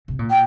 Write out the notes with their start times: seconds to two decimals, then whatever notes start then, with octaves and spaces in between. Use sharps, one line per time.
0.08 C3
0.19 A#2
0.29 G5